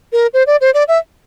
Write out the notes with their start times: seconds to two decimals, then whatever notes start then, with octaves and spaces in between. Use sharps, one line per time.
0.12 A#4
0.33 C5
0.47 D5
0.61 C5
0.74 D5
0.88 E5